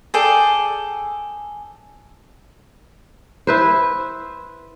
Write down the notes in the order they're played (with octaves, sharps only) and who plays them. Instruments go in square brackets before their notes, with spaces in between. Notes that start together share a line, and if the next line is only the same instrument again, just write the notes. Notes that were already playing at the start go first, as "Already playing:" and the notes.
[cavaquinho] G#4 A4 D5 G5
[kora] E4 B4 C5